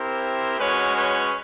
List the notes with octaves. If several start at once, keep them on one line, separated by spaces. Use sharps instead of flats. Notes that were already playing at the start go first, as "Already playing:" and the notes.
Already playing: C4 E4 G4 A#4 C5
G#3 C#4 F#4 B4 C#5
B4 C#5